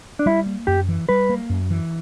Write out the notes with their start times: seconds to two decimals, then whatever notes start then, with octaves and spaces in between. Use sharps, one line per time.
0.19 D4
0.26 G3 E4
0.46 A#3
0.67 F#2 G4
0.88 E3
1.09 G3 B4
1.29 A#3
1.50 F#2
1.70 E3